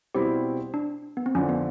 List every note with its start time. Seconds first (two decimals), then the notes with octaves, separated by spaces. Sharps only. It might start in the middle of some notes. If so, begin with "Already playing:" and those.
0.15 B2 G3 C4 E4 G4
0.74 D4
1.17 B3
1.26 C4
1.35 F2 D3 F3 C#4
1.49 B3